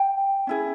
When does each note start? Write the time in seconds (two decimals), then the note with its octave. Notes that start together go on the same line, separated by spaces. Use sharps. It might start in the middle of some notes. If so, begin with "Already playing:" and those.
Already playing: G5
0.47 C#4 E4 G#4